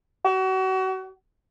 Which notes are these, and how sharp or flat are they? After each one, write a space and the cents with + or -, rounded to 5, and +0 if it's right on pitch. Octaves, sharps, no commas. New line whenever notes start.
F#4 +35